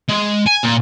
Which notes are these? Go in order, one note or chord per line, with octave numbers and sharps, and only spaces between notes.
G#3
G#5
A#2